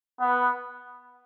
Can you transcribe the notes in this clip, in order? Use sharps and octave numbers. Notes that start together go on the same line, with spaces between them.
B3